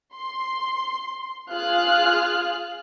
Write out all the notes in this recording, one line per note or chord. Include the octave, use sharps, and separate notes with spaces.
C6
F4 G#4 F5 F6 F#6